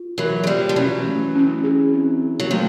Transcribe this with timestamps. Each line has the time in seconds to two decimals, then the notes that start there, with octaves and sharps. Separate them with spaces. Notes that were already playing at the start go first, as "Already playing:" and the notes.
Already playing: F4
0.18 E3 F#3 A#4
0.43 G#3
0.47 F3 G3 D5
0.69 F3
0.76 E3 F#3 C#4
1.06 A3
1.35 C#4
1.64 G#4
1.93 C4
2.22 G#4
2.40 F#3
2.51 D#3 F3 A3